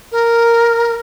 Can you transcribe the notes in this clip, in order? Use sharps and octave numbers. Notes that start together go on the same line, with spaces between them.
A#4